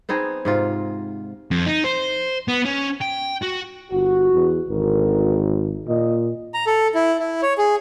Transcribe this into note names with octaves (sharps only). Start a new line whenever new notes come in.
B3 C4 D#4 G#4
G#2 C3 F4
F2
D#4
C5
B3
C#4
G5
F#4
G1 F#4
E2
G#1 D2 A#4
A#2 D#5
A#5
A4
E4
E4
C#5
G#4